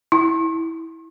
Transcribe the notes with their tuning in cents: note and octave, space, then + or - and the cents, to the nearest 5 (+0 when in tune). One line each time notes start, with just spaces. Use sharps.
E4 -15